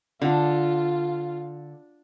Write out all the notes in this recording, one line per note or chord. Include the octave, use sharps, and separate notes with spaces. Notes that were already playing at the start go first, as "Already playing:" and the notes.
D3 F4